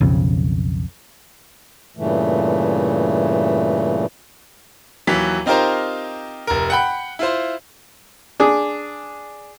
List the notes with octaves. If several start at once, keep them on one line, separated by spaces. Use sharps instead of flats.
B1 F2 C#3
G2 A#2 C#3 E3 A3
D#2 E3 F#3 B6
C4 D#4 F4 G4 A#4 C5
F1 A#4
F#5 G5 B5
E4 F4 C5
D4 G#4